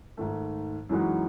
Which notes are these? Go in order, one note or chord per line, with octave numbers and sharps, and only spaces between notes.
G#2 D#3 A3
F#2 E3 G#3 D#4 F#4